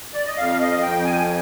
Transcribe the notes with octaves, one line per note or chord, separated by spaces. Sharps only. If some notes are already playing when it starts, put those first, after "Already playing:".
D5
D#5
F2 F5
D#5
F2 G5
G#5